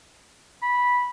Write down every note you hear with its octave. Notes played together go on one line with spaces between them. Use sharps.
B5